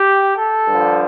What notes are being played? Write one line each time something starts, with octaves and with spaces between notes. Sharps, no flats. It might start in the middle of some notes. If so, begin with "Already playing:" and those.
Already playing: G4
A4
G2 D3 F3